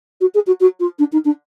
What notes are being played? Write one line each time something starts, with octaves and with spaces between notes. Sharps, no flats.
F#4
G#4
F#4
F#4
F4
D4
D#4
D4